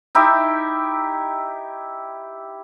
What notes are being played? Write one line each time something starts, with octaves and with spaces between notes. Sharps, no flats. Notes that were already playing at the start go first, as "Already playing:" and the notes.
D#4 E4 G4 E5